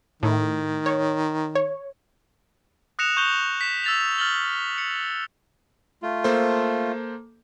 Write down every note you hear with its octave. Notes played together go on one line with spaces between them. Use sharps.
A2 D#3
C#5
C#5
D#6 F#6 A#6 C#7 E7 F7
C#6 G6 F7 G7
B6 E7
E6 A6 F7
F6 A6 F#7 G7
C#7
A3 F4
A#3 A4 C5